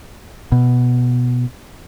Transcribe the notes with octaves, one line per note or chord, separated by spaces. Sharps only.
B2